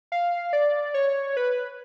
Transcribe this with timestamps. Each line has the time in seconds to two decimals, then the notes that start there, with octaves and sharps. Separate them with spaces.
0.12 F5
0.53 D5
0.94 C#5
1.37 B4